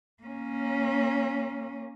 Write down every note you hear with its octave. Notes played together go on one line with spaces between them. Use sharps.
A#3 C#4